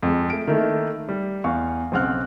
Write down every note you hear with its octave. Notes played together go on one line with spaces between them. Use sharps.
F2 G#3
A3 D7
D#3 A3 A#3 E4 A4
G3
E2 F5 C#6
B1 C#3 C4 F#5 F6 F#6